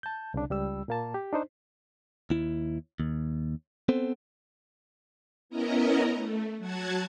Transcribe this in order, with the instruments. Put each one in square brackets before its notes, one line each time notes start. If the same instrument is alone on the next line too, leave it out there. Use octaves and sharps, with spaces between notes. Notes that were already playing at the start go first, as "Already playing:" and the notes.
[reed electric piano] A5 G6
C2 C#3 D4
C#2 G3 E6
A#2 A#3 A5
G4
D4 D#4 C5
[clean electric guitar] D#2 E4
D#2
B3 C4 A4 C5
[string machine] B3 C#4 E4 A#4 D#5 A#5
A3
F#3 F#4 F#5 A5 G#6